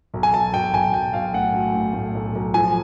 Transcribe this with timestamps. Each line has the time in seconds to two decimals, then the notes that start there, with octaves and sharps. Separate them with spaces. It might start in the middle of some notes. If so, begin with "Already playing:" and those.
0.14 B1
0.23 G#5
0.34 B1 A5
0.54 B1 G5
0.74 B1 G#5
0.94 B1 G5
1.13 B1 F5
1.34 A2 F#5
1.54 F#3
1.75 A2
1.94 A2
2.14 B1
2.35 B1
2.54 F3 G#5